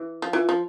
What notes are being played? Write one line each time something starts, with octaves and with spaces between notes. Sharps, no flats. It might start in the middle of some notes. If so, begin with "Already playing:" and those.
Already playing: E3
F3
E3 F4
F3